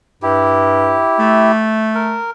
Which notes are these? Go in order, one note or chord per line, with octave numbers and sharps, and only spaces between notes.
G2 E4 G4
A3
A#4